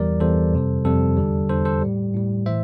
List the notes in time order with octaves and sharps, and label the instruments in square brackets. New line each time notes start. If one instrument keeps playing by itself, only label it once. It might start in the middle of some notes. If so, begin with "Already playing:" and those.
Already playing: [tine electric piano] E2 E3 G3 A#4 D5
E2 E3 G3 A4 C5
F2 C3 G3
F2 C3 G3 A4
E2 D3 G3
E2 D3 G3 A4 C5
A4 C5
A2 G3
A2 G3
A2 E3 C5 E5